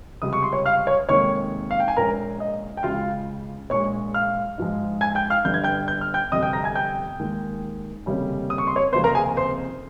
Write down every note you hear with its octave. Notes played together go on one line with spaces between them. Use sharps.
C#2 C3 G3 D#6
C#6
C6
C#5 C#6
F5 F6
C#5 C#6
F1 D#2 D#3 G#3 C#5 C#6
F5
G5
G#5
A#1 A#2 G#3 C#4 A#4 A#5
D#5
G5
C#2 C#3 G#3 F4 F5
A#1 A#2 G#3 C#5 C#6
F5 F6
G#2 F3 G#3
G#5 G#6
G5 G6
F5 F6
G1 G2 G3 G6
G#6
G5 G6
G6
F6
G5 G6
G1 F2 C3 G3 D#5 D#6
G5 G6
A#5 A#6
G#5 G#6
G5 G6
D#2 D#3 G#3
F1 D#2 C#3 G3 C#4
D#6
C#6
C6
C#5 C#6
F1 D#2 C#3 F3 C4 C5 C6
A#4 A#5
G#4 G#5
C5 C6